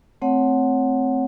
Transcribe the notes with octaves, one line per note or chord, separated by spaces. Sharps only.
A3 C4 C#5 F#5